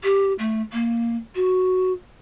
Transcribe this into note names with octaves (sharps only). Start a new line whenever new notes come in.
G4
A3
A#3
F#4